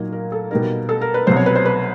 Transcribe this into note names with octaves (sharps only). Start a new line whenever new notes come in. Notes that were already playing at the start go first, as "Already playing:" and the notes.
Already playing: A#2 F#3 A#3 D#4
A#4
A4
B2 G3 A#3 D#4 A#4
A4
A#4
B4
C2 B2 F#3 C5
C#5
B4
C5
B4